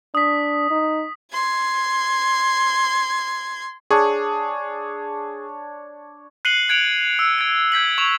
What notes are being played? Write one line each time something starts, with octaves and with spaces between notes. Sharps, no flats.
D4 D#6 B6
D#4
C6 G#6
D4 G#4 C#5
F#6 C7 C#7 D#7 F#7 G7
F#6 G#6 C#7 D7 F7 F#7
E6
G#6 D7
G6 G#6 B6 F#7
C#6 G#6 F7